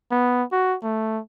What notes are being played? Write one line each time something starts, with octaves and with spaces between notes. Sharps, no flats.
B3
F#4
A3